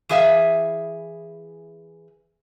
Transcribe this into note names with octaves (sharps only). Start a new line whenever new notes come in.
E3 G#4 E5 F5